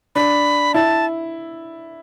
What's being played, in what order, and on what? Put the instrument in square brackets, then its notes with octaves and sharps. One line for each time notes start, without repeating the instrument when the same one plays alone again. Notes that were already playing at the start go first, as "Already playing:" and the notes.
[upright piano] D4 [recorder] B5
[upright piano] E4 [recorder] A5